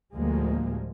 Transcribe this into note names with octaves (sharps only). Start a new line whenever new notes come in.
D2 A2 F3 G3 G#3 A#3